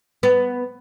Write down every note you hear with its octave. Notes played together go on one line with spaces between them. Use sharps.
B3